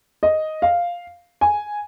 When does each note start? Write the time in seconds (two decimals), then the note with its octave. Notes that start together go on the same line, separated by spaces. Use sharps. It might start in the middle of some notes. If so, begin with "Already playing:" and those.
0.23 D#5
0.62 F5
1.41 G#5